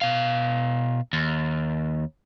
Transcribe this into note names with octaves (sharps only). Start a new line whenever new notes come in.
B2 F5
D#2